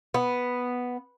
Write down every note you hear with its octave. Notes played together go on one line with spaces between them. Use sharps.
B3